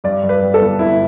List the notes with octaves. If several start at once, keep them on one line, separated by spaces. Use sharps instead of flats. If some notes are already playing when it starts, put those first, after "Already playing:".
G2 D5
G2
B4
G3
A4
G1
G1 E4